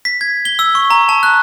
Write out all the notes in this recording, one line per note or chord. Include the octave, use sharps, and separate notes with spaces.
B6
G#6
G7
E6
C#6
A#5
A5
F#6